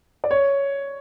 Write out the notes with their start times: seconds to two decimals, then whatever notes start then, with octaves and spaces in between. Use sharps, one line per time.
0.24 D5
0.31 C#5